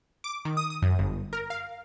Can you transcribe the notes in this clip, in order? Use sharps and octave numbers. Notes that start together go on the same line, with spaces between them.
D6
D#3
D#6
D#6
F#2
G1
A#4
F5